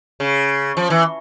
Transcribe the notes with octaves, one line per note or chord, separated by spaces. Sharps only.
C#3
F3
E3